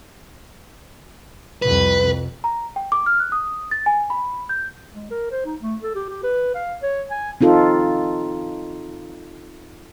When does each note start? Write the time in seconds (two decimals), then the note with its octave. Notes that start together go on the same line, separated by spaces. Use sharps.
1.62 C2 F2 B4
2.44 A#5
2.76 G5
2.92 D6
3.06 F6
3.20 F#6
3.32 D#6
3.71 A6
3.86 G#5
4.10 B5
4.49 G6
4.94 G#3
5.11 A#4
5.31 C5
5.45 D#4
5.61 A3
5.82 A4
5.95 G4
6.09 G4
6.23 B4
6.55 F5
6.82 C#5
7.11 G#5
7.41 C4 D#4 F4 A4